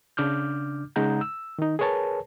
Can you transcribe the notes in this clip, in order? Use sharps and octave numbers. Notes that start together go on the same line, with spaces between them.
C#3 D4 D6 F6 G6
C#3 G#3 D#4 F#5 A#5 G6
E6
D#3 D#4
G#4 A#4 B4 C#5 G#5 A5